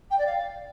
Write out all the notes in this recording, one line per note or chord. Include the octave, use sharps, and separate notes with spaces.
G5
D5
F5